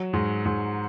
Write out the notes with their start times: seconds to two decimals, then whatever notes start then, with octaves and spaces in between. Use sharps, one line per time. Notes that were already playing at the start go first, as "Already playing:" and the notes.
Already playing: F#3
0.13 G#2
0.45 G#2